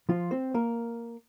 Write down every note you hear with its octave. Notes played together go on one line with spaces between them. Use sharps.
F3 F4
C4 C5
A#3 A#4